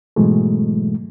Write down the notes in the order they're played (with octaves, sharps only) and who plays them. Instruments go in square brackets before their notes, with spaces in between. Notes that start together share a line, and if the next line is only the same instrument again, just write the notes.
[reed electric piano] G#2 B2 E3 F#3 G#3 A3